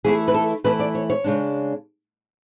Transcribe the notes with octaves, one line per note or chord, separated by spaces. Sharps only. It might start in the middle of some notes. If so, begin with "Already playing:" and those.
E3 A3 E4 G#4
B4
A4
E3 A3 E4 B4
D5
C#5
C#5
C#3 G#3 D4